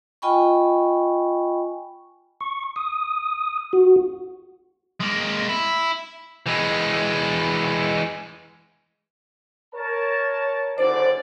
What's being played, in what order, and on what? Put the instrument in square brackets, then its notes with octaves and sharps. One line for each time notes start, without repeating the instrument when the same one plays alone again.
[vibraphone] F4 D#5 G5 G#5 B5 C#6
[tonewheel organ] C#6
D#6
F#4
[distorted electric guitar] G#3 A#3
E4
E3 G#3
[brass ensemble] A#4 C#5 A5
[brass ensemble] F#1 D3 D5 [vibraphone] C5